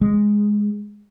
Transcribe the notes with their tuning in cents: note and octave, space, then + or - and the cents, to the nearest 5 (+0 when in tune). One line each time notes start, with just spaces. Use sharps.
G#3 +0